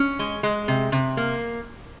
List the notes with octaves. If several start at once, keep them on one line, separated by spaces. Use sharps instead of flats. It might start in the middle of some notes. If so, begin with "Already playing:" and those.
Already playing: C#4
G#3
G#3
C3
C3
A#3